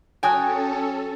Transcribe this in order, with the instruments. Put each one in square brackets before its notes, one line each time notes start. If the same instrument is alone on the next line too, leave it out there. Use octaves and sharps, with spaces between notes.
[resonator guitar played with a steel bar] F#3 G5 [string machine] C#4 A4 [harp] G#5 D#6 F#6